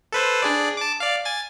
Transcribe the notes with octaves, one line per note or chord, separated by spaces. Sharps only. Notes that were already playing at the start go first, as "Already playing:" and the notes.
A4 B4 C5
D4 G#4 D5
A5 D6
D5 F5
G#5 A6